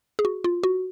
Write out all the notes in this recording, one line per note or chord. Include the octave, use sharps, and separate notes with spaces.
G#4
F#4
F4
F#4